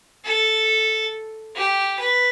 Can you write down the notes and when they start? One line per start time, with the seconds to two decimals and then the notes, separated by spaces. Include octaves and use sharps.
0.25 A4
1.56 G4
1.99 B4